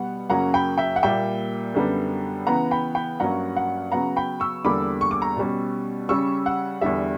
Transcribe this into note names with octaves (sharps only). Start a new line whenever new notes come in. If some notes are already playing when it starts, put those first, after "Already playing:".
Already playing: B2 G3 B3 F#5
F#2 C#3 F#3 A#3 C#4 F#5 A#5
G5 B5
E5 G5
F#5
A#2 G3 A#3 E5 G5
F#2 D3 G3 B3
C#3 E3 B3 F#5 A#5
G5 B5
G5 B5
G2 F#3 A#3 C#4 F#5 A#5
F#5
C#3 F#3 B3 F#5 A#5
G5 B5
C#6 E6
E2 D3 G3 A#3 B5 D6
C#6
D6
A#5 C#6
B2 G3 C#4
C#3 G3 C#4 C#6 E6
F#5
E2 D3 G3 E5